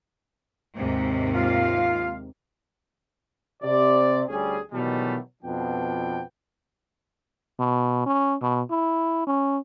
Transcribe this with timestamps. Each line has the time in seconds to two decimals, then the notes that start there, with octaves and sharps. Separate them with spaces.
0.76 D#2 G#2 C3
1.35 F4 F5
3.63 C3 D5
4.29 D2 G3 C#4 G#4
4.72 B2 D#3 E3 F#3 G3 A3
5.43 F2 B2 F3 B3 D4 G5
7.59 B2
8.06 C#4
8.42 B2
8.71 E4
9.27 C#4